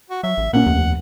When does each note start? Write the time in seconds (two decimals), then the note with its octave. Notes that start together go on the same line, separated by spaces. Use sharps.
0.10 F#4
0.23 F#3 E5
0.37 A1
0.53 A#2 A#3 C#4 F#5
0.66 F1 D#2